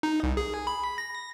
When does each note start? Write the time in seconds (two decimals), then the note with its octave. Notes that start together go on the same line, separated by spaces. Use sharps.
0.03 D#4
0.23 C2
0.37 G#4
0.67 B5
0.98 A#6